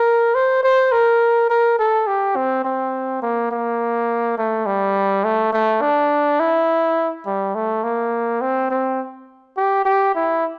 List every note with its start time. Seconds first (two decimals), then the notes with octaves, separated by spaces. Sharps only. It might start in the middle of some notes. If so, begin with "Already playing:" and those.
Already playing: A#4
0.35 C5
0.63 C5
0.92 A#4
1.50 A#4
1.79 A4
2.07 G4
2.36 C4
2.65 C4
3.22 A#3
3.51 A#3
4.38 A3
4.66 G3
5.24 A3
5.53 A3
5.81 D4
6.40 E4
7.26 G3
7.55 A3
7.84 A#3
8.41 C4
8.71 C4
9.57 G4
9.85 G4
10.15 E4